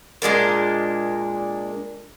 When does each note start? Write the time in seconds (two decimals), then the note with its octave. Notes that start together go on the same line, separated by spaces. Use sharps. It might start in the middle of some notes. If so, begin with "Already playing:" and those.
0.22 A#2 G#3 D4 A#4